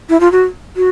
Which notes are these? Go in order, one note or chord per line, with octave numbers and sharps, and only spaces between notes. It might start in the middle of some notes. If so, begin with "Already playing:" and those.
E4
F4
F#4
F#4